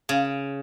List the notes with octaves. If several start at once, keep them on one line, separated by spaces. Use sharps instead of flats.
C#3